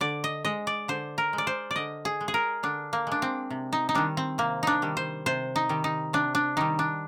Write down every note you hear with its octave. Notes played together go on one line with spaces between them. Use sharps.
D3 D5
D#5
G#3 D#5
D5
D3 C5
A#4
G#3
D5
C5
D5
D3 D#5
G#4
G#3
G#4
A#4
D3 D4
A#3
G#3 D4
C4
C3
D#4
D#4
D#3 G3 D4
C4
C3 A#3
D4 D#4
D#3 G3
C5
C3 C5
D#4
D#3 G3
D#4
C3 D4
D4
D#3 G3 D#4
D4